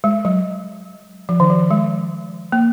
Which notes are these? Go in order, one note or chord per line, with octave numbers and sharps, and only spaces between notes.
G#3
F#3
F3
D#3
F3
G#3
A#3